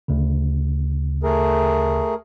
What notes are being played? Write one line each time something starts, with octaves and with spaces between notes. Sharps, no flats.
D2 C#3
A3 G#4 A#4